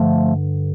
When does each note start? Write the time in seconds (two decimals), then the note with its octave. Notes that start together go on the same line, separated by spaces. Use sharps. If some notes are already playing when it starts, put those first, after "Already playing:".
Already playing: G2 D3 F3 A3